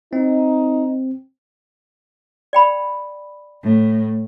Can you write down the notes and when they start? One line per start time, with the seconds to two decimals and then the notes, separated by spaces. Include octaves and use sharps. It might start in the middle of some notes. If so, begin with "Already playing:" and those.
0.13 C4 D#4
2.53 D5 G5 B5
3.64 A2